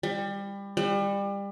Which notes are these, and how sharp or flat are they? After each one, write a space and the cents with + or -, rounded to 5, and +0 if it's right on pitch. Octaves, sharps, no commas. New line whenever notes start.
G3 +25
G3 +30